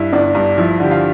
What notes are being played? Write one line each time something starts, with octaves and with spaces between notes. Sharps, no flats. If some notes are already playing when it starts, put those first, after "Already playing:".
Already playing: G2 E4
G1 D4
G2 D4
F3 E4
D3 G4
F4